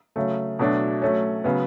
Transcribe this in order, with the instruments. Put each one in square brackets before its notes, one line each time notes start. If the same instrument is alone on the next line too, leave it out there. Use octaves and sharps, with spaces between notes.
[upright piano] C#3 F#3 A3
B2 F#3 A3 D4
F#3 A3 C#4
C#3 F#3 B3